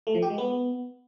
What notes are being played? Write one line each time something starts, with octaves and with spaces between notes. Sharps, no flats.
A3
F3
G4
G#3
B3